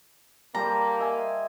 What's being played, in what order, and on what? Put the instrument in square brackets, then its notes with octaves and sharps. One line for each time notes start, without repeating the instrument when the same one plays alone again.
[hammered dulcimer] G3 A4 C5 [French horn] A#3 [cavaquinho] A#5
[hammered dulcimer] D#5 E5 G#5